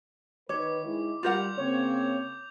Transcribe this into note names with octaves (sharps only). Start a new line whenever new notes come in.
D#3 B4 C#5 D6
D#3 G#3 E4
G3 F4 A#4 F#5 D6 G6 F7
C#3 A#3 C4 C#5